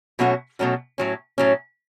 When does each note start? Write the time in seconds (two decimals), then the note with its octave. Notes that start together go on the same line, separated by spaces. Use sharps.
0.19 B2 F#3 A3 C#4 F#4
0.59 B2 F#3 A3 C#4 F#4
0.98 A2 F#3 C#4
1.38 A2 F#3 C#4